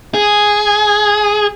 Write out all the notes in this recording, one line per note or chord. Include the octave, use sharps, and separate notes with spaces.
G#4